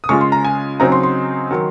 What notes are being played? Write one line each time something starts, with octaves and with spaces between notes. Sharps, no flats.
D#6
C#3 G#3 C#4 F4 C#6
C6
A#5
G#5
C#3 F#3 C4 D#4 A#5
C6
C6
D#3 F#3